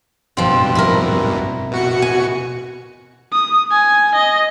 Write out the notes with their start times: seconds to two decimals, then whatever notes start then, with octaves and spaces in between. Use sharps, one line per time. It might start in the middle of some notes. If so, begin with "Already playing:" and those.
0.37 G2 B2 F3 C4
0.75 E4 A#4
1.72 B2 F#4 C#7
2.02 G#5
3.33 D#6
3.71 G#5
4.15 D#5